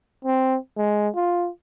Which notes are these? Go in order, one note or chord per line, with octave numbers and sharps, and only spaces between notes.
C4
G#3
F4